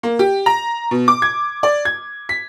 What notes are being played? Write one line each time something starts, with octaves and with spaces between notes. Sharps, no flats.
A#3
G4
A#5
B2
D6
G#6
D5
G#6
B6